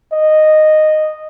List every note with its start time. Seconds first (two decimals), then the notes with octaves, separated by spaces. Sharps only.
0.13 D#5